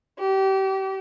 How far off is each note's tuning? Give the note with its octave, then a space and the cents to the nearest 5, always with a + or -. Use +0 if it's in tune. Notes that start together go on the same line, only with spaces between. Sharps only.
G4 -30